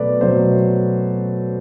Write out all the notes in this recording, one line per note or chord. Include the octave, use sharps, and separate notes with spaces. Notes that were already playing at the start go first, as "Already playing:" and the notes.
Already playing: B2 F#3 A3 A4 B4 D5
B2 F#3 A3 C5